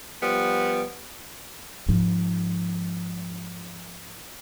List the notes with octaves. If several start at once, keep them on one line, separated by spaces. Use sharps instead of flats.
F3 G3 B3
G#2 F3